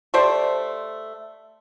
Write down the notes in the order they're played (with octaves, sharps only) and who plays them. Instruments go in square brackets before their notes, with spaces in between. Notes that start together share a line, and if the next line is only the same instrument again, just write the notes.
[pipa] A3 G4 C5 D5